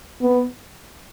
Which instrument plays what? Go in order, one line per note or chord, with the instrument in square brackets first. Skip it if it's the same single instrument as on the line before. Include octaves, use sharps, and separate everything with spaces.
[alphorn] B3